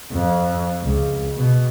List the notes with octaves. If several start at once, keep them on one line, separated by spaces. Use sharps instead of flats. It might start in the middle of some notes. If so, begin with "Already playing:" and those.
F2
C#2
B2